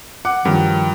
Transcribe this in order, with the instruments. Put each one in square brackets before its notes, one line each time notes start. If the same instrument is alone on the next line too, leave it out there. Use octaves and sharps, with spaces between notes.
[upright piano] F#5 D6
[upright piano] G2 F3 F#3 [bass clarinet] D#3